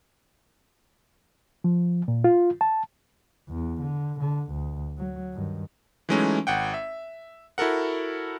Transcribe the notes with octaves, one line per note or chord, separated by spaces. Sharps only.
F3
A#2
F4
A5
E2
D3
D3
D2
F#3
G2 D#3
E3 F#3 G#3 A3 C#4 D#4
G#1 F#5 G5
E5
E4 F#4 A4 A#4 F#5